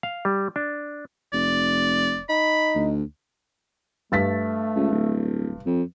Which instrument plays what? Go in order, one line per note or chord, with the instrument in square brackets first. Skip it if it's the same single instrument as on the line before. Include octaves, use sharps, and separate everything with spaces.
[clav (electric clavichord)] F5
G3
D4
[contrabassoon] F1 [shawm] D5
[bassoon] D#4 [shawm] B5
[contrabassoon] D2
[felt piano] G2 A6 B6 [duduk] A3
[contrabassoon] C#2
D1
F2